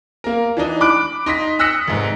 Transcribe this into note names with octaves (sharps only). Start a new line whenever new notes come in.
A#3 A#4
E3 D4 D#4
B5 D6 F#6 D7
D#4 C6 A#6 B6
D#6 E6 F#6 A#6 B6 C#7
F1 G#2